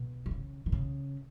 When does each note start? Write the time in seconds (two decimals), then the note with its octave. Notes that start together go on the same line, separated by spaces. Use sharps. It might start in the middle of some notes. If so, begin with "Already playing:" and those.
Already playing: B2
0.26 D#3
0.31 C#3
0.66 D#3
0.72 C#3